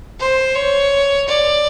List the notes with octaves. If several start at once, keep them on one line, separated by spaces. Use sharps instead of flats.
C5
C#5
D5